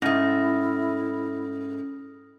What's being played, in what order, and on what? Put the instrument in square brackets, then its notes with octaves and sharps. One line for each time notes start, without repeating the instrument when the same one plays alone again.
[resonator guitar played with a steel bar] G#2 A3 [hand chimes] C#4 [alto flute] E4 [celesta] D#6 F6 A#6